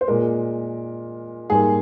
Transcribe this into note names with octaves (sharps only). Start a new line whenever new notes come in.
C5
A#2 G#3 A#4
G#2 G3 A#3 G#4